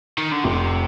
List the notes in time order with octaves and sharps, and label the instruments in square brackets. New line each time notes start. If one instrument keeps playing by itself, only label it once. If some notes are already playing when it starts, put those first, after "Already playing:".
[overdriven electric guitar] D#3
D3
[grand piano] F1 [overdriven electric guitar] C3